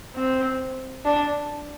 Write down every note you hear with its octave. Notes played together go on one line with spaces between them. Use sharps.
C4
D4